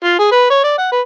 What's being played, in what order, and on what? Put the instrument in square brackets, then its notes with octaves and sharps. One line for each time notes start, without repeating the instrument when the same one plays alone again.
[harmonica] F4
G#4
B4
C#5
D5
F#5
B4